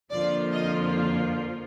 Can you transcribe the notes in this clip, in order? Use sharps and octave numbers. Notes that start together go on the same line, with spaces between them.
F2 D3 F3 A#3 F4 D5
D#5